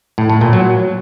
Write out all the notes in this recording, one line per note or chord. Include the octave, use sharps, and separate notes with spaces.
A2
A2
A#2
F#3